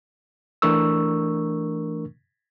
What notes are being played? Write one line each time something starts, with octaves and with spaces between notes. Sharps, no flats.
E3 A3 D4 A#4 C#6 E6